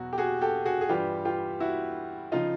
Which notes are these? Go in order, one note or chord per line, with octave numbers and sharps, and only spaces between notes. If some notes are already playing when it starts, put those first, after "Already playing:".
Already playing: E2 B2 F#3 F#4
G4
F#4 G#4
G4 A4
F#4 G#4
G#4
G2 E3 G3 F4 G4
F4 G4
E4 F#4
C#3 F3 D#4 F4